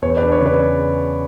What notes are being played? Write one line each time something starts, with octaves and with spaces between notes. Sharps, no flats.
E2 C#5
B4 D5
D4
C#5
C#3 B4 D5